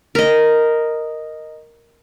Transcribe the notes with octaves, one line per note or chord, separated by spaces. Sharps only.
A#4 D#5